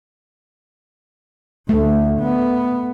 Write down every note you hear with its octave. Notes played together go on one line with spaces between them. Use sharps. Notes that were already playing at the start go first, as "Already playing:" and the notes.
D2 A3
B3